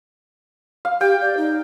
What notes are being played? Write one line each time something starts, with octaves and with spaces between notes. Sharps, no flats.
F5
G4 G5
D5
D#4